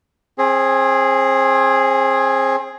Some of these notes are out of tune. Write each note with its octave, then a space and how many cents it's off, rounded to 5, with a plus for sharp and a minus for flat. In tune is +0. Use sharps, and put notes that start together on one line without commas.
C4 +35 G#4 +0